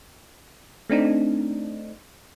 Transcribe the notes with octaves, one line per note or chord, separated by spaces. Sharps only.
A3 C4 D4 D#4